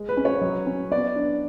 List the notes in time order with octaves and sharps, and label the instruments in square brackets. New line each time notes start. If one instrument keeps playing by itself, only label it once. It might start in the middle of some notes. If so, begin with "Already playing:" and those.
Already playing: [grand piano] G#3
[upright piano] B4
[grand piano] C#4
[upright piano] C#5
[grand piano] F#3
C#4
[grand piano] B3 [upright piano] D5
[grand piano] D4